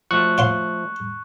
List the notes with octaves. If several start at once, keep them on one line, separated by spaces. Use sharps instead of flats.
F3 A3 C#6 F#6
C#5 F5 C6